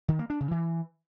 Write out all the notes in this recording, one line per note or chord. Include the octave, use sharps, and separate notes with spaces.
D#3
A#3
D4
C#3
E3